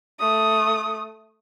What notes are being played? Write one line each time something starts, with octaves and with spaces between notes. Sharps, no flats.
A3 D#6